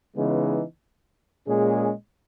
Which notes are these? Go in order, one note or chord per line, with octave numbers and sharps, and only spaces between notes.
C#3 E3 G#3 B3 D#4
A#2 G#3 C#4 G#4